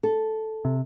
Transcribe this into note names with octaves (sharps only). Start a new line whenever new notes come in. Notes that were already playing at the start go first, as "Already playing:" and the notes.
A4
C3